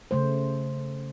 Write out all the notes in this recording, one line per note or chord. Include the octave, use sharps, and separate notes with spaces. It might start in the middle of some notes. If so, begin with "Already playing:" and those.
C#3 A3 C5